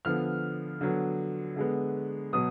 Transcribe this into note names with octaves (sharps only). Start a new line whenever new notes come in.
D3 F3 B3 F6
D3 F#3 B3
D3 G#3 B3
B2 F#3 B3 D#6